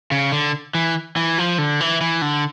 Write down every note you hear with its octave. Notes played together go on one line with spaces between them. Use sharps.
C#3
D3
E3
E3
F3
D3
E3
E3
D3